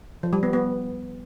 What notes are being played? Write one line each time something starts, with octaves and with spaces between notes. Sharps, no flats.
F3
G3
B3
B3